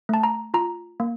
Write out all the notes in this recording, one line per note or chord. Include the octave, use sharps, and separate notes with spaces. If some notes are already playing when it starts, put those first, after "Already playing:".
A3 A5
A#5
F4 A#5
A#3